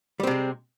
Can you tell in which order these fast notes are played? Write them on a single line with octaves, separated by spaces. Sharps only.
G3 C4 C3 G#3